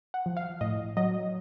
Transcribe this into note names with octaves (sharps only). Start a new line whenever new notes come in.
F#5
F3
F5
A2 D#5
F#3 D#5